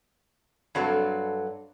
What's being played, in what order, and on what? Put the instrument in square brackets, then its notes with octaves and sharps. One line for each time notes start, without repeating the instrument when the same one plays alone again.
[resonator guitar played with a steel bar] G2 F#3 C4 A4 D5